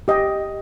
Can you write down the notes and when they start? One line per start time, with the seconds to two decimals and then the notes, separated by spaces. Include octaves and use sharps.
0.08 G4 D#5 G5